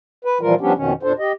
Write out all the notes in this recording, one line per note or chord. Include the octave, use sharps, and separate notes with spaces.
B4
A#2 E3 F3 G3 F4 A#4
F3 G3 B3 C#4 D4 G4
F2 B2 D#3 C#4
E2 A#2 D4 A4 C5
G4 D#5